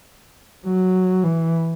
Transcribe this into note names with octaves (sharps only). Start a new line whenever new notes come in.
F#3
E3